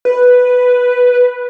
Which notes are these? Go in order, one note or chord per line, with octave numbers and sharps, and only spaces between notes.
B4